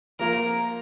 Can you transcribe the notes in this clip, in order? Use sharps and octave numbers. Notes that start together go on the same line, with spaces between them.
F3 A#3 F4 A#4